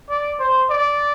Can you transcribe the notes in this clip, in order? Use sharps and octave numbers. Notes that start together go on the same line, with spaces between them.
D5
C5
D5